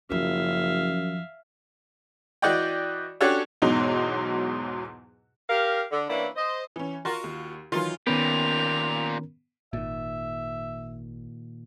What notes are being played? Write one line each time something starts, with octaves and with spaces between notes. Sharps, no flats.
F#1 F#2 D#3 F3 E5 F5
E3 F#4 D5 D#5 G5
C#4 D4 F#4 G4 A4 C#5
E2 G#2 B2 F#3 D#4
G4 A#4 F5
D3
E3 A#3 B3 C#4 D4 E4
C5 D#5
E3 C#4
F4 F#4 A#4
D#2
D#3 E3 F#3 F4
A#2 D#3 B3 C#4 G4 A#4 F7
G#1 A#2 D#3 E5